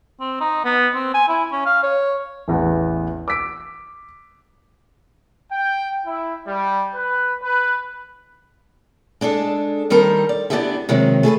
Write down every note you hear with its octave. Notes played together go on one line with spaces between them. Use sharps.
C4
D#4
B3
C4
G#5
E4
C#4
F5
C#5
A1 E2 B3 F#5
D6 E6 B6 D7
G5
E4
G3
B4
B4
G#3 D4 G#4 A4
D#3 G3 D#4 A4 A#4 C5
D5
B3 D4 E4 G4 G#4 E5
C3 D#3 F#3 G#3
A3 G#4 A4 B4